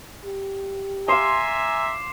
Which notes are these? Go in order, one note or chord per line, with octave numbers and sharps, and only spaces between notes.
G4
E5 F5 G#5 A#5 C6 D6 C7 E7